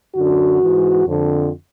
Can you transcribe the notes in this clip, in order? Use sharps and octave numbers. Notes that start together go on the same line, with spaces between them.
F#2 D3 F#4
G#2 E3
F2 D3